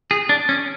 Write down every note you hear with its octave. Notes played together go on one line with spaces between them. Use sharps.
G#4
D4
C#4